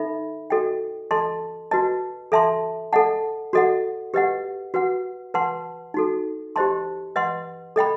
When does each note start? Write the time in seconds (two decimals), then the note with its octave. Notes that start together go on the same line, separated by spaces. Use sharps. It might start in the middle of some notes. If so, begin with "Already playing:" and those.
Already playing: D#4 A4 E5 B5
0.50 F#4 A4 D#5 G5
1.11 A4 D#5 A5 C6
1.71 F#4 B4 D#5 A5
2.32 A4 E5 A5 C6
2.93 A4 D#5 F#5 A5
3.53 F#4 A4 D#5 F#5
4.14 G4 B4 D#5 F#5
4.74 F#4 B4 F#5
5.34 B4 F#5 A5 C6
5.94 D#4 F#4 A4
6.56 G4 C5 D#5 A5 C6
7.16 B4 D#5 F#5 C6
7.76 A4 D#5 G5 B5